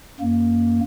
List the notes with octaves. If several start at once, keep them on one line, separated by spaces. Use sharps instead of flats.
F#2 A#3